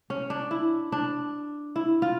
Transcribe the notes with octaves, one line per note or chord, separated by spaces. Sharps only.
C#4
D4
E4
D4
E4
F4